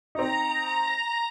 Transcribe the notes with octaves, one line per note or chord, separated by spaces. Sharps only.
C4 D#4 A#5